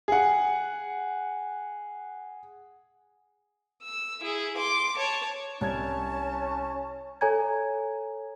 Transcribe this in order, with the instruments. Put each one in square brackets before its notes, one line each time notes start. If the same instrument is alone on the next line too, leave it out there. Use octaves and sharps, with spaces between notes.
[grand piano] G#4 F#5
[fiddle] E6
E4 G#4
C6 D6
C#5 A5
[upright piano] C2 G#6 [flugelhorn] C#4 [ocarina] C#5 [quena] A5
[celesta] A4 C#5 G#5 A#5 G#6